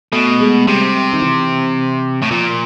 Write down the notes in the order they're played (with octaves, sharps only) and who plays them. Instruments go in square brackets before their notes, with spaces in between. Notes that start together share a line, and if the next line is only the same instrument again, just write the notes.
[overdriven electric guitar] B2 [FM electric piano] A3
[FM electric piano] G#3
[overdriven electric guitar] C3 [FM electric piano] G3
[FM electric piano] D#3
E3
[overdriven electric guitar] A2
[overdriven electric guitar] A#2 [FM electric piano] F3